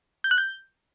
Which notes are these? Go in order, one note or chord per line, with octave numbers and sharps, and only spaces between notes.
G6
F#6
G6